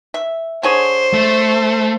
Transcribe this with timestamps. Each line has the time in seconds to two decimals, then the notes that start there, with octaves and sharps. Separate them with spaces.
0.14 E5
0.63 D3 G#4 C5 C#5
1.13 A3